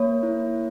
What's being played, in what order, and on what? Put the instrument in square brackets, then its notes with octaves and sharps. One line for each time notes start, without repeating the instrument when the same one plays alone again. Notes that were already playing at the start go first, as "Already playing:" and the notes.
Already playing: [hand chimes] A#3 C#5
E4